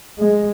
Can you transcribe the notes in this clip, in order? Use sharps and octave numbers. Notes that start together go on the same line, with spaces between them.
G#3